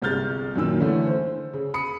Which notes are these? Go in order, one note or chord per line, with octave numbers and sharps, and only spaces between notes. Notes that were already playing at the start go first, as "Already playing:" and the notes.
G1 C2 G#3 F6 G6 A6
F#2 A#2 D#3 E6
D3 E3 A3 C#4 E4
C5
C#3
B5 D#6 C#7